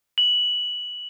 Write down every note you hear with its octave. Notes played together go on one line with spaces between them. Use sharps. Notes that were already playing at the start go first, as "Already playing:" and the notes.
F#7